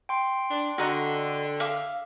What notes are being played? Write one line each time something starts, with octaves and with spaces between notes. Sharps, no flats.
G5 C6
D4
D3 F#4 D#5 A#5
E5 F5 D6